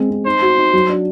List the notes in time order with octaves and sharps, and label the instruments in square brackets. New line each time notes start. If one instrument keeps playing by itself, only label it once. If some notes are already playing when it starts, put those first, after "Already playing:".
Already playing: [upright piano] G#3 C4
C4
[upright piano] D#4 [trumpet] C5
[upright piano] F#4
D#4
F#3
D4